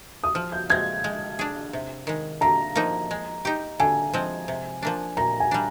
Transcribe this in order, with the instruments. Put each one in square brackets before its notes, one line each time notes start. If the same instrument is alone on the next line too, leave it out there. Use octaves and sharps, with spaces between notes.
[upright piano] D#6
[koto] F3 [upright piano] F6
[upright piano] G6
[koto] G#3 C4 [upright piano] G#6
[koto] G#3
D4 G#4
C3
D#3 G#3
[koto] D3 [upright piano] A#5
[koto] F3 A#3 D#4
G#3
D#4 G4
[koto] D3 [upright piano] G#5
[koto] F3 G#3 C4
C3
F3 A#3 D4
[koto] A#2 [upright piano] A#5
[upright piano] G#5
[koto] G3 D4